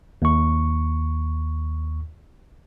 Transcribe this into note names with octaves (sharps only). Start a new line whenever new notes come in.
D#2 C#6